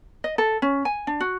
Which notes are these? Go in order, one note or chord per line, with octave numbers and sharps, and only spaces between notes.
D#5
A4
C#4
G#5
D4
F#4